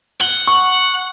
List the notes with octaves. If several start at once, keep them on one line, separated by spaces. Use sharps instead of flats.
F#5 G7
C#6